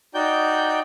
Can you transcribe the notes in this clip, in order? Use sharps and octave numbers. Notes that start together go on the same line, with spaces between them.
D#4 F#4 D5 G5 G6